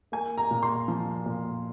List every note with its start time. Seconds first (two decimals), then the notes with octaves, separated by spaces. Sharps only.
0.12 A#3 G#5
0.38 A#5
0.51 A#2
0.63 C6
0.88 F3
1.26 A#2